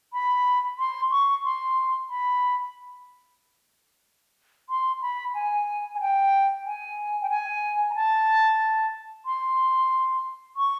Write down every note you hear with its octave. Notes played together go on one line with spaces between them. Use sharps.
B5
C6
C#6
C6
B5
C6
B5
G#5
G#5
G5
G#5
G5
G#5
A#5
A5
C6
C#6